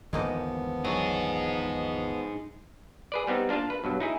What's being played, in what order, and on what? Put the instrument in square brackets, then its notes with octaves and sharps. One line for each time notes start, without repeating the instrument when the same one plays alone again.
[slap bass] G#1 E2 D3 [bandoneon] F3 B3 [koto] G#3 A#3 D#4
[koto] F#3 [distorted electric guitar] D#4 G#4
[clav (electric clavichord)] G#4 B4 D5
G3 B3 C4 D#4
A#3 D4 F4 F5 A5
B4
G2 B2 F#3
D#4 E4 G#4